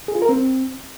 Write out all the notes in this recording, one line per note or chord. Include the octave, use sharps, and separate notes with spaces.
G#4
F4
A#4
C4